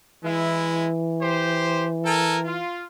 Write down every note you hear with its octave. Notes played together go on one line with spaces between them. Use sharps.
E3 G#3 E4
G4 C5
A4 A#4 G#5
F4